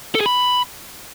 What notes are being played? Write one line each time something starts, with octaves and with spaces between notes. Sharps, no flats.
A4
G#4
B5